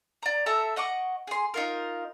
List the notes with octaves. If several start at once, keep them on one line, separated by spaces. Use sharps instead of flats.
D5 A#5
A4 E5 A5 A#5
D#5 F#5 C#6 D6
G#4 C6
D#4 F4 A#4